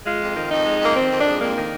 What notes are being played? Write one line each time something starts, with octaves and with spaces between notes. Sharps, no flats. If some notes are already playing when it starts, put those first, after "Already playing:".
G#3 F4
F2
D#3
F2 D#4
G#3
F2 A#3
D#3 C4
F2
D4
G#3
F2 A#3
D#3